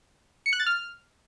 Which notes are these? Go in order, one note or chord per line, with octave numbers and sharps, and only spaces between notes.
C#7
F#6
A6
F6